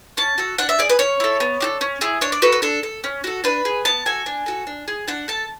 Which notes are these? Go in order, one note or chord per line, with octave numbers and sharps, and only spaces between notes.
C#4 A5
F#4 A4
D4 F#5
E5
G#4 D5
B4
C#4 C#5
E4 A4
B3
D4 F#4 A4
C#4
E4 G#4
D4 C#5
D5
F#4 A4 B4
B4
D4 A4
A4
C#4
F#4 A4
D4 B4
G#4
B3 A5
F#4 A4 G#5
D4
F#4 A4
D4
G#4
D4 F#5
A4 A5